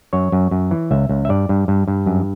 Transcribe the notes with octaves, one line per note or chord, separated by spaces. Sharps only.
F#2 C#5
F#2
F#2
E3
C#2 E5
C#2
E5
G2 D5
G2
G2
G2
F#2